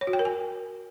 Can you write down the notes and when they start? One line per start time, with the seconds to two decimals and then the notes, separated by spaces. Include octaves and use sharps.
0.01 C#5
0.07 F#4
0.13 G5
0.19 A#4
0.25 G#5